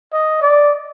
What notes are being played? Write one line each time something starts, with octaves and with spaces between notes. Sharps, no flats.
D#5
D5